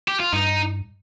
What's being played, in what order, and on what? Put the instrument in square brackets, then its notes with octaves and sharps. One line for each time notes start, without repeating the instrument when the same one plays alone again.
[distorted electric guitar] G4
F4
[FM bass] G2 [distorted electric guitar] D#4